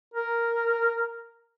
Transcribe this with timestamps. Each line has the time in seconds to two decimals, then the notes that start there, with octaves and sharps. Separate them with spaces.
0.14 A#4